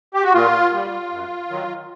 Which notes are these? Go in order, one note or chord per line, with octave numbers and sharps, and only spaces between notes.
G4
F#4
A#2 F4
G3
F#2
D#3 F#3